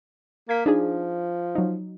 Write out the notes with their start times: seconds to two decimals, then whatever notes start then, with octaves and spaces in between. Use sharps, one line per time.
0.49 A#3 G#6 B6
0.66 F3 D4 D#4 G#4
1.55 F#3 D#4